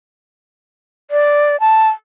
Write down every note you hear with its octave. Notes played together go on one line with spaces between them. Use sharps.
D5
A5